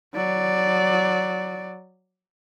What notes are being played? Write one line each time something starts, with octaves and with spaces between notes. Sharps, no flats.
F#3 D5